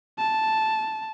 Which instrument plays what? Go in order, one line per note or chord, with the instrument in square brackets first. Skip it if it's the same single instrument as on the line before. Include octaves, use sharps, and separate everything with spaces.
[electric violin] A5